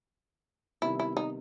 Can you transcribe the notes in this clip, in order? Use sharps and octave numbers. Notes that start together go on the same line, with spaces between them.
C3 D#3 G3 B3 E4
E4
D#4